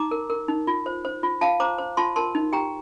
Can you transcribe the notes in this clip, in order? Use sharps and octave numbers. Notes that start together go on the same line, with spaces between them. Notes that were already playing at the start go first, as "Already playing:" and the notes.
Already playing: D#4 A#5 D6
A#4
A#4
D#4
F4
C5
C5
F4
F4 F5 A5
C5 A#5 D6
C5
F4 A5 C6
A#4 A5 C6
D#4
G4 G5 A#5